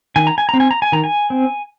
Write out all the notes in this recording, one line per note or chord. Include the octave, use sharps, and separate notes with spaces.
D#3 G#5
A#5
G#5
C4 A#5
G#5
A#5
G#5
D#3 A#5
G#5
C4